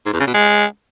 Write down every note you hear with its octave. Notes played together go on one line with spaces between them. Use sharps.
G#2
E2
C#3
B2
G#3